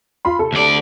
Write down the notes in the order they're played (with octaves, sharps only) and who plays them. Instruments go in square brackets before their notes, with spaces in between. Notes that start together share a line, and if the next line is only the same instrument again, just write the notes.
[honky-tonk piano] F4 B5 C6
C3 A4
[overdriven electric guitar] D2 D5